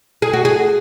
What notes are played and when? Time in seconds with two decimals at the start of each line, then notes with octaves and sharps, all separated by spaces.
0.22 G#4
0.33 F#4
0.45 G#4